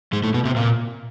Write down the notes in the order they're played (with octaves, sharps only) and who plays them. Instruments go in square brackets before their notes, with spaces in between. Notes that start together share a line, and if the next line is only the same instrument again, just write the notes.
[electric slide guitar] G#2 G#3
A2 A3
B2 B3
C3 C4
A#2 A#3